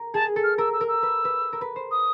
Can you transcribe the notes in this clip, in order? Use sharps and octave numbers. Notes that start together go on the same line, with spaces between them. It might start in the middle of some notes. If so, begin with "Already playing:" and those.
Already playing: A#4
G#4 A5
A4
F6
A#4 E6
E6
A#4
E6
B4
B4
A#4
B4
C5
D#6